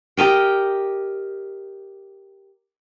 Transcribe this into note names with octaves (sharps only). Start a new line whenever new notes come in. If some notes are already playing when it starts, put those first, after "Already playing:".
G4 A#4 D#5 G5